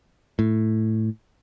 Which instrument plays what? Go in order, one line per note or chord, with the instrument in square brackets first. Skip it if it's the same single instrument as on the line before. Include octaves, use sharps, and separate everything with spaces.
[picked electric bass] A2